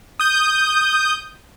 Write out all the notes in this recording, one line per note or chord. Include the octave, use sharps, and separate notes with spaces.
D#6 G6